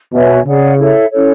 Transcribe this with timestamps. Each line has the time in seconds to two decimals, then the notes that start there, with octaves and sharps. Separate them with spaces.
0.13 B2 F#4 C#5 E5 G#5
0.46 C#3 G#4 D5 F#5
0.78 E4 A4 C#5 E5
1.11 C#4 E4 A4 C#5